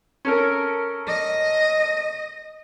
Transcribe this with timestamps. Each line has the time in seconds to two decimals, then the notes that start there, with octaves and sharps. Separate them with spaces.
0.25 C#4 A4 A#4
1.07 D#5